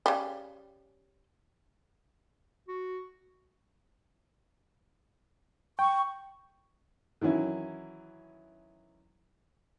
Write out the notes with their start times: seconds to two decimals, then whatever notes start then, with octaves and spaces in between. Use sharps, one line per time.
0.06 C#3 G3
2.68 F#4
5.79 G5 C#6
7.21 D#3 E3 F#3 C#4 E4